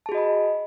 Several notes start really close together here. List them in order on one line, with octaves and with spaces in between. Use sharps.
A5 G#4 F#4 D#5 B5